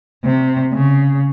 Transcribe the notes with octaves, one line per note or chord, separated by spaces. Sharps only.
C3
C#3